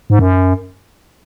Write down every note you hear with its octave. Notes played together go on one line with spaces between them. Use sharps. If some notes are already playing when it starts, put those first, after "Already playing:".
G#2
F#2